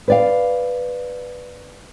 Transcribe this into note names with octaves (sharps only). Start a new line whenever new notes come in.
B4 D5 F5